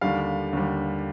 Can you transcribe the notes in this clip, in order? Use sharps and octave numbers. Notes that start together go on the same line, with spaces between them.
D#2 D3 G3 F5
D#2 D3 G3